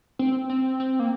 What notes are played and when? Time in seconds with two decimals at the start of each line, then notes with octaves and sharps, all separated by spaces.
0.19 C4
0.49 C4
0.80 C4
1.00 A#3